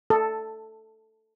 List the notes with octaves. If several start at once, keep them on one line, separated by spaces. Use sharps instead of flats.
A4